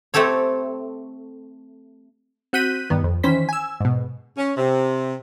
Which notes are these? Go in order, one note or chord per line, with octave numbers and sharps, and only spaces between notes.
A3 C4 G4 A4 C#5
C4 F#4 F#6 G6 B6 D#7
G2 D#3 B3
F2
D#3 E3 C#4 C5 B6
G#5 E6
G#2 B2
C#4
C3